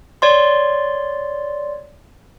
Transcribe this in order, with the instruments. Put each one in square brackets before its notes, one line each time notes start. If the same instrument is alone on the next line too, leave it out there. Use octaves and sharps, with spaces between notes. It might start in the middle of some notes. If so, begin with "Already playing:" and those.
[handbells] C#5 D5 C6